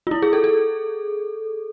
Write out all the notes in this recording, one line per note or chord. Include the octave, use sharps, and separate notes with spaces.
F4
E4
G#4
A4
A4